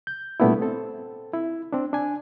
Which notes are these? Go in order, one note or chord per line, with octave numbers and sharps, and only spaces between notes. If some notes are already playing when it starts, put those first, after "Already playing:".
G6
A#2 G3 A3 B3 D4 E4
C4 A4
E4
C4 D4
D4 G#5